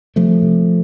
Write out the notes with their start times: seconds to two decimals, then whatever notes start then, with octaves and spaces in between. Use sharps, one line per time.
0.16 C3 F3 A3
0.43 C3